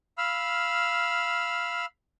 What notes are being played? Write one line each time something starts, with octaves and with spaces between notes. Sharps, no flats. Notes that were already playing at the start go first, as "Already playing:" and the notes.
F5 B5 E6 F6